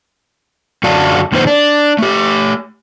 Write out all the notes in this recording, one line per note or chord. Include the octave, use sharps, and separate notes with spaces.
F#2 D3 F#4 D5 F5 A5
F2 A#2 D#3 B3 E4 C5
D4
A3 G4